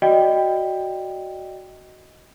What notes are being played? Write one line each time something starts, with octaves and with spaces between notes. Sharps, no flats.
F#4 D5 D#5 G5